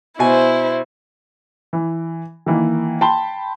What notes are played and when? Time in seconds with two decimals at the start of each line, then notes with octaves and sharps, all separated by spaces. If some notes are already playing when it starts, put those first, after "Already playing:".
0.19 B2 E4 C5 G#5
1.73 E3
2.46 D#3 E3 A#3
3.01 G5 A5 B5 C6 G7